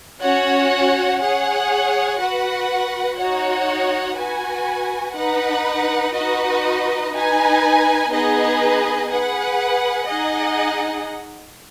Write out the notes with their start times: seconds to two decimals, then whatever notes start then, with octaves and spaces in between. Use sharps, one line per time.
0.22 C#4 F#4 C#5 F#5
1.20 G#4 C#5 F#5
2.18 F#4 B4 F#5
3.17 D#4 F#4 C#5 F#5
4.17 F#4 B4 G#5
5.15 D#4 B4 F#5
6.14 D#4 F#4 B4 D#5
7.12 D#4 B4 G#5
8.11 B3 D#4 G#4 B4 D#5
9.09 G#4 B4 F#5
10.08 D#4 G#4 D#5 F#5